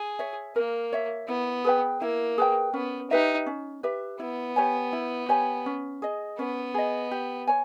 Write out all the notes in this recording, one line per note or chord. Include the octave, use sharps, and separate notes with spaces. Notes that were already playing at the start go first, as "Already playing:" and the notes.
Already playing: G#4
C#5 E5
A#3 A#4
C#5 E5
B3 E4
G#4 B4 G5
A#3 E4
G#4 B4 G5
B3 C#4
D#4 G4 B4 E5
C#4
G4 B4 E5
B3 E4
G4 C#5 G#5
E4
G4 C#5 G#5
C#4
G#4 D#5
B3 C#4
G#4 D#5
G4
C#5 G#5